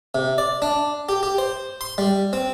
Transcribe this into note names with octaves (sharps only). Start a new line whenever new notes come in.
C3
D5
D4
G4
G4
C5
C6
G3
C4